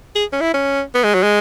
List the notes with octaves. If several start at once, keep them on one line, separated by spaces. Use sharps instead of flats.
G#4
C#4
E4
C#4
B3
G#3
F#3
G#3